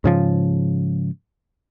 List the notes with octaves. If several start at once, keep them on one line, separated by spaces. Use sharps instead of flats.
G#2 C#3 F3